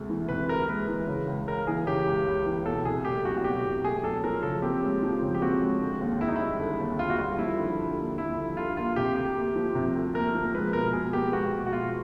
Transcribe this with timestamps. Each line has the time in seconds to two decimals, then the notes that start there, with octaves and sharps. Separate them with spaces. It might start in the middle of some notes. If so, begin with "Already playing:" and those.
Already playing: D2 C3 G#3
0.10 E3
0.29 C3 B4
0.49 D2 A#4
0.69 G#3 B4
0.88 E3
1.07 C#3
1.27 C#2
1.47 C#2 A#4
1.67 E3 G#4
1.86 C#3 G4
2.07 C#2
2.26 C#2
2.46 E3
2.65 B2 A4
2.85 C2 G#4
3.05 A3 G4
3.24 F#3 F#4
3.38 F#4
3.44 B2 G4
3.64 C2
3.84 A3 G#4
4.03 F#3 A4
4.24 F3 A#4
4.43 C#3 A4
4.62 C4 G4
4.83 G#3
5.02 F3
5.22 C#3
5.34 G4
5.42 C4 F#4
5.62 G#3
5.81 D3
6.01 D#2
6.21 D#2 E4
6.28 D#4
6.36 G3 E4
6.59 D3
6.80 D#2
6.99 D#2 F4
7.10 F#4
7.18 G3 F4
7.39 F3 E4
7.58 D3
7.78 D3
7.98 A#3
8.18 F3 E4
8.37 D3
8.57 D3 F4
8.77 A#3 F4
8.96 C3 G4
9.16 D2 G4
9.36 A#3
9.56 F3
9.75 C3
9.95 D2
10.14 A#3 A#4
10.34 F3
10.54 G#3 B4
10.73 B2 A#4
10.93 B2 G#4
11.13 B3 G4
11.33 G#3 F#4
11.53 B2
11.67 F#4
11.72 B2 F4